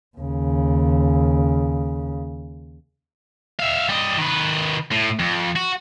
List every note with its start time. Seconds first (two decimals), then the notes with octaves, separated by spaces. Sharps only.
0.18 D#2 C#3
3.59 E5 F5
3.89 G3 D#5
4.17 D#3 B4
4.91 A2
5.19 F2
5.56 F#4